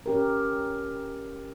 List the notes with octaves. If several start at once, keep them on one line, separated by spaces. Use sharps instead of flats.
C#4 G4 A#4